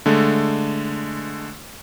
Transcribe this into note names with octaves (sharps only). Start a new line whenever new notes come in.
D3 G#3 A3